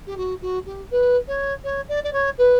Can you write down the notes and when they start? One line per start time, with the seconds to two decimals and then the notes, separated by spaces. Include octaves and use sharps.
0.07 G4
0.17 F#4
0.42 F#4
0.66 G4
0.91 B4
1.28 C#5
1.64 C#5
1.89 D5
2.04 D5
2.13 C#5
2.38 B4